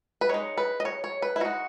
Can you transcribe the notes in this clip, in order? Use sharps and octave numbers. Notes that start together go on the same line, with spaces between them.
B4
G#3 D#4 C#5
B4
D#5
C#5
C#5
B4
E4
G#3 D#4 F#4